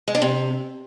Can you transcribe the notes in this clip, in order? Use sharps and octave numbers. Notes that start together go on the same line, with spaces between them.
G#3
D4
C3